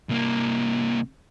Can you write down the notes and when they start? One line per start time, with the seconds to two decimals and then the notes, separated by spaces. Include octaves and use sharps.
0.09 C2 A#3